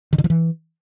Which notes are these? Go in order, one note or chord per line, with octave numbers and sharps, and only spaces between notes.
D#3
D3
F3
E3